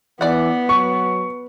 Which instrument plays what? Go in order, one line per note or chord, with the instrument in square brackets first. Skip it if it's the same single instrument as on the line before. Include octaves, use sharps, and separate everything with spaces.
[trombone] E3 [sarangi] B3 [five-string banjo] D5 F#5
[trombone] F#3 [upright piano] C#6